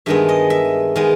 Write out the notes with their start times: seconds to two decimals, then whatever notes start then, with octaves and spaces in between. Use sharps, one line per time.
0.06 G2 D#3 G#3 B3 E5
0.29 D#5
0.50 E5
0.96 D#3 G#3 B3